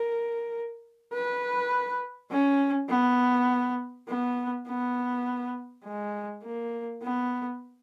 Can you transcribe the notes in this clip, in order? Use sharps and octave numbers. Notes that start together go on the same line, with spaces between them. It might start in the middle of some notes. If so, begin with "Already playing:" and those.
Already playing: A#4
B4
C#4
B3
B3
B3
G#3
A#3
B3